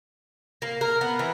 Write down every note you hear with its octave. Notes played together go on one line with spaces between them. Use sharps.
A#3
A#4
B3
E3